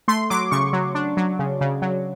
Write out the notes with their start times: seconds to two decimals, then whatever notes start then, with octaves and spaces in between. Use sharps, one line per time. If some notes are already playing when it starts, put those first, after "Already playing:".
0.08 A3 C6
0.30 F#3 D6
0.51 C#3 C#6
0.73 F#3
0.95 D4
1.17 F#3
1.39 C#3
1.61 C#3
1.82 F#3